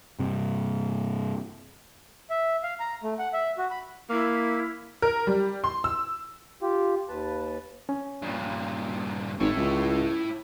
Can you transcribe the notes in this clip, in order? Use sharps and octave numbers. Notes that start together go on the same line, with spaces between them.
G2 C3
E5
F5
A#5
A3
F#5
E5
F#4
B5
A#3 E4
A#4
G3
C6
E6
F4 G4
D#2 B4 A5
C#4
G2 A#2
G#1 E4 C#5
C#2